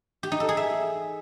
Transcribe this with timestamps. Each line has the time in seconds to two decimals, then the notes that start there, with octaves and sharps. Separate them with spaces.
0.23 G4
0.32 D#4
0.40 A4
0.49 G#4
0.57 E5